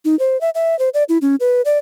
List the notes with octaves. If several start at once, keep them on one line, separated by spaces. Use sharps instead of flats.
D#4
C5
E5
E5
C5
D5
E4
C#4
B4
D5